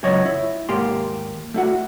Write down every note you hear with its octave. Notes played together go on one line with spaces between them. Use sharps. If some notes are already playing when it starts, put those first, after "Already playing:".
C#2 F#2 C#5 D#5
E4
D#2 G#2 A#3 G4 C6
A3 E4 F#4